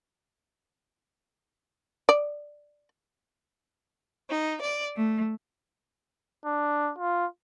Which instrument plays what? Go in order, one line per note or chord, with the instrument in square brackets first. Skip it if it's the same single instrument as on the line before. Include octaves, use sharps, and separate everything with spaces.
[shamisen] D5
[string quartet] D#4
D5
A3
[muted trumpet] D4
F4